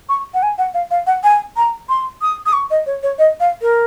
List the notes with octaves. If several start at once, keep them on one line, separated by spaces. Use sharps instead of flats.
C#6
F#5
G#5
F#5
F5
F5
F#5
G#5
A#5
C6
D#6
D#6
C#6
D#5
C#5
C#5
D#5
F5
A#4